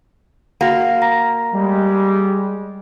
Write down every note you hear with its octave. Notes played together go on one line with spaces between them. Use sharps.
A#3 F#4 F#5
A#5 A#6
G3 G#3